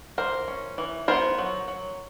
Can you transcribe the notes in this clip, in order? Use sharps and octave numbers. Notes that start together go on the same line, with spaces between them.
E3 A#4 C5
C#4
E3
B3 A#4 C5
F#3
F#3